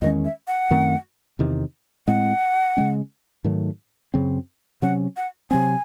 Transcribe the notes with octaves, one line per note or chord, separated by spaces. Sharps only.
E2 D#3 G#3 C#4 D#5
E5
F#5
F#2 D#3 A3 C4
E2 C3 D#3
A2 G#3 C4 F#5
C#3 G#3 C#4
G#2 D#3 F#3 A3
F#2 C#3 F#3 C4
C3 F#3 C#4 F#5
F#5
C3 F#3 C4 G#5